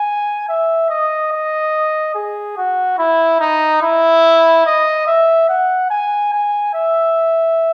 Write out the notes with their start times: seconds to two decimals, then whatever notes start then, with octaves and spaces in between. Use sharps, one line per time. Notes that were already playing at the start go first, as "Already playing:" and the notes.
Already playing: G#5
0.49 E5
0.90 D#5
1.32 D#5
2.15 G#4
2.57 F#4
2.98 E4
3.40 D#4
3.82 E4
4.66 D#5
5.07 E5
5.48 F#5
5.90 G#5
6.33 G#5
6.75 E5